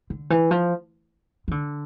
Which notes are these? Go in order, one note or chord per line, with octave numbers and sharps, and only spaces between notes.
D3
E3
F3
E3
D3